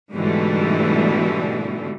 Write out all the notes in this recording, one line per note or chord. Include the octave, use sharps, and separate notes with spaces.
G#2 B2 D3 E3 G3 A3